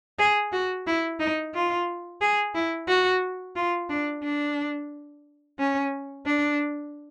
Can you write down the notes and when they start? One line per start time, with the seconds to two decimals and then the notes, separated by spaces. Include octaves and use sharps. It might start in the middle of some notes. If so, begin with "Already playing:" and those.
0.19 G#4
0.53 F#4
0.87 E4
1.20 D#4
1.55 F4
2.21 G#4
2.55 E4
2.89 F#4
3.56 F4
3.90 D4
4.24 D4
5.59 C#4
6.26 D4